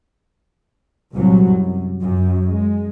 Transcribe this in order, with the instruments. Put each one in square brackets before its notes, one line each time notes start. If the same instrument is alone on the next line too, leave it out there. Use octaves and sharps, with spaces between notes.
[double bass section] C2 A#2 F#3
F#2
F#2
G#3